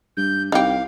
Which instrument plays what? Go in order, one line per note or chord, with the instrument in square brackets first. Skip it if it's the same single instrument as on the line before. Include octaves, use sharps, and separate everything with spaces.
[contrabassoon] G2 [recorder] G6
[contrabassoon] C2 [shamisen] D#4 G4 [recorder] F5